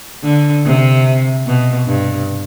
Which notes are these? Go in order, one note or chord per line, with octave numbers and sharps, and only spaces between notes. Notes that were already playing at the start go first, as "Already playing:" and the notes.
D3
C3
B2
G2